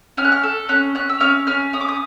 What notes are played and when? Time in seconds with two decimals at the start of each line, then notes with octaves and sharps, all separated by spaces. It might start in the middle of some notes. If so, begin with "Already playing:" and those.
0.17 C#4 F6
0.25 F#6
0.32 F6
0.43 A4
0.69 C#4 F#6
0.95 C#4 F#6
1.09 E6
1.20 C#4 F6
1.47 C#4 F6
1.73 C#4 D#6
1.81 D6
1.89 D#6